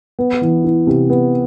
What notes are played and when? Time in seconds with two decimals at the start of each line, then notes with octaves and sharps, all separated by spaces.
0.19 B3
0.41 E3
0.64 E4
0.87 C3
1.10 B3